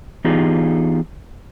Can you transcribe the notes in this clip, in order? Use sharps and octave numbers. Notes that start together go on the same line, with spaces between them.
E3 B3 D#4 F4 G4 G#4